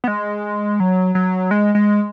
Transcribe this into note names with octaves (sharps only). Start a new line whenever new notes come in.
B3
G#3
F#3
F#3
G#3
G#3